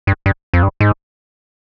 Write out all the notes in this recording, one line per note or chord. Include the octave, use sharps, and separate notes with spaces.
G2
G2
F2
G2
G#2